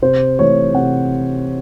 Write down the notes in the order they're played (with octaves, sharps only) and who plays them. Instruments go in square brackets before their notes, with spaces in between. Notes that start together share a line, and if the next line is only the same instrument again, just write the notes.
[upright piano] C3 C5
E3 A3 C#5
C3 F#5